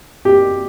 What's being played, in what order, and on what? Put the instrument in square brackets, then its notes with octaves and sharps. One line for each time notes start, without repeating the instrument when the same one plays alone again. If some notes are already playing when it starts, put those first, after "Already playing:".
[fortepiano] G4